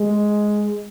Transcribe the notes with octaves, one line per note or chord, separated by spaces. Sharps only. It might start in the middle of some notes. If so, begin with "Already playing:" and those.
Already playing: G#3